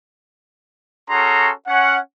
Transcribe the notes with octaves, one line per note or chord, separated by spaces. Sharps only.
C#4 F#4 G#4 A4 A#5 C6
C#4 F#5